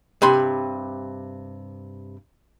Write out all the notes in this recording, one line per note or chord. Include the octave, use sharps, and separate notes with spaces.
G2 C3 B5 C6